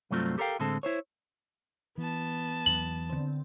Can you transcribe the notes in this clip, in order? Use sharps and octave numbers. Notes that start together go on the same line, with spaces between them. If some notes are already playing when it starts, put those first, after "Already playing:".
C2 G2 F#3 A3 C4 F4
G4 A4 A#4 C5 F5 G5
A2 D3 G#3 C4 A4
E4 C5 C#5
E3 B3 A5
E2 E3 F#3 F#7
D3 C4